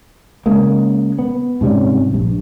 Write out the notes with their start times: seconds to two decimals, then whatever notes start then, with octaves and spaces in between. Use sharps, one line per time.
0.46 C#3 G#3 A#3
1.19 B3
1.61 G#2 C3 G3 C#4
2.12 A#1 G2